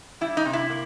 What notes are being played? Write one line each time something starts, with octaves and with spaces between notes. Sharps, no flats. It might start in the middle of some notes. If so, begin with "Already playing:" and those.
G3 E4
D#4
C3
E4
A#3